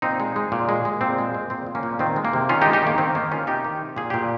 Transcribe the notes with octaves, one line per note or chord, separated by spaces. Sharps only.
A#2 C4 D#4
G#3
G#3
A#2
G#3
G#3
A#2 C4
G#3
G#3
A#2 C4
A#2
A#3 C#4
A#2
D#3 C4
G#3
A#3
C3
D#3 C#4 F4
D#4 G4
G#3
D#4 G4
D#3 A#3
D#3 C4
D#3 A#3
D#3 C#4 F4
C3 D#4 G4
D#3
C3
A#2 G#4
A#2 G4